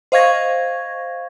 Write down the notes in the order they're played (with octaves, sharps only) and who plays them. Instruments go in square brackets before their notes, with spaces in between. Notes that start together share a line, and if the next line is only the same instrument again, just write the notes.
[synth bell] C5 D#5 F5 C#6 G#6 A#6